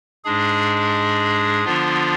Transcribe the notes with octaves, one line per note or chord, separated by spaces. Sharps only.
G#2 G#3 D4 G#4
D3 F3 B3 D4 F4